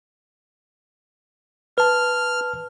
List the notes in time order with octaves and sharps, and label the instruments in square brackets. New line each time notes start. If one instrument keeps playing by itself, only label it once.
[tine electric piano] B4 A5 [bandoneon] F6